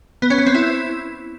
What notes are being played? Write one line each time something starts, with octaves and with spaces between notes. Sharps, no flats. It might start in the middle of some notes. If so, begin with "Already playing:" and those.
B3
C#4
B3
C4
E4